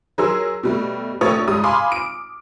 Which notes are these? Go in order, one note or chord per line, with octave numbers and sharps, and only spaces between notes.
F#3 G#4 A#4 C6 E6
B2 G3 A3
A#1 A3 G4 C#5 D#6 A6
G#2 G3 D#6
F5 G#5 B5 C6 D6 F6
D7